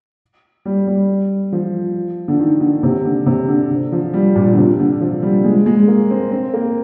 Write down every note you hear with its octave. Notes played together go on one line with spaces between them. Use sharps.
G3
G3
F3
D3
D#3
D3
C3
D3
C3
D3
D3
F3
G3
A#2
D3
C3
D3
F3
G3
G#3
G#3
A#3
C4
C4
A#3